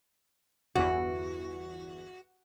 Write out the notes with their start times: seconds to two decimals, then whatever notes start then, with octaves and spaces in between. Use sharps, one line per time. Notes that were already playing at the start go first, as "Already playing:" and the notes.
0.75 G1 E2 E3 F#4